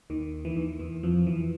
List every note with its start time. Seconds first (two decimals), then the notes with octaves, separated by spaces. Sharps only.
0.10 D#2 D#3
0.45 E3
0.56 D#2 D#3
0.79 E2 E3
1.03 F2 F3
1.27 E2 E3